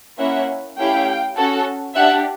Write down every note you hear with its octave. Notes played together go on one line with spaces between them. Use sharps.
A#3 C#4 E4 E5 F#5
A3 C#4 E4 G4 F5 G5
C#4 F#4 A4
D4 G4 E5 F#5